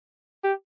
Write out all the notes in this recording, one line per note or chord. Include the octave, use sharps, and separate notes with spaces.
G4